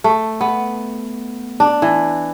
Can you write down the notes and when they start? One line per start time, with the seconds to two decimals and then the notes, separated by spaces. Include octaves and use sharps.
0.04 A3
0.41 B3
1.60 D4
1.82 E3